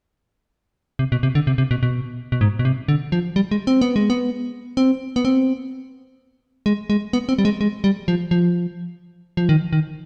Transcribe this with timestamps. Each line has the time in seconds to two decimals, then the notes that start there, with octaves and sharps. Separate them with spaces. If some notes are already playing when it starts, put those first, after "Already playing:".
0.99 C3
1.12 B2
1.23 C3
1.35 D3
1.47 C3
1.58 C3
1.71 B2
1.83 B2
2.32 B2
2.41 G#2
2.59 B2
2.65 C3
2.88 D3
3.12 F3
3.36 G3
3.51 G#3
3.67 C4
3.81 B3
3.96 G#3
4.10 B3
4.77 C4
5.16 B3
5.25 C4
6.66 G#3
6.90 G#3
7.13 B3
7.29 C4
7.39 G3
7.45 G#3
7.61 G#3
7.84 G3
8.08 F3
8.31 F3
9.37 F3
9.49 D#3
9.73 D#3